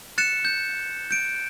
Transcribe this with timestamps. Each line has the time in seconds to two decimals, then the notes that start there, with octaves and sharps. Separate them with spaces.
0.18 F#6 A6 C#7 E7
0.45 G6
1.11 G6 D7